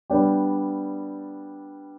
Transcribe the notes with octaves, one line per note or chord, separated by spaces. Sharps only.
G3 B3 D4 G4